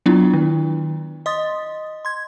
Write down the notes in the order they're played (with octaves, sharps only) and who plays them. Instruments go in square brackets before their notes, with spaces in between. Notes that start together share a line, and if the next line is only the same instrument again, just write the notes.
[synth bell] F#3 B3 D4 E4 F4
D#3
D#5 C6 D#6 A6
C6 G#6